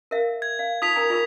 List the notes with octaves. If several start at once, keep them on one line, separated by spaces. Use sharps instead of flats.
A#4 E5 F5
G#6
F5
D#4 F4 A4 D#6 B6 F7
A#4 G#5 A#5
F4 G#4 A#4